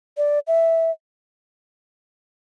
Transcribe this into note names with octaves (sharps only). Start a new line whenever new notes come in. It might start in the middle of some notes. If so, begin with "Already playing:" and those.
D5
E5